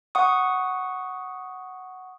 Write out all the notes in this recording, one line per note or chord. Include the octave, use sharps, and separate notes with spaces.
F#5 C#6 D#6